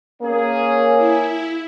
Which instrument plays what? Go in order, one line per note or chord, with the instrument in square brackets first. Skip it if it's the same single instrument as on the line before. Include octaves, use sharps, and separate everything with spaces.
[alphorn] A#3 [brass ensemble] C#4 G#4
[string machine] E4